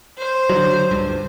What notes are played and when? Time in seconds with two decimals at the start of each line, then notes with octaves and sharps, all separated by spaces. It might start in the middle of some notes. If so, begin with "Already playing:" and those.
0.18 C5
0.50 D3 D#3 F#3
0.91 C#2 G2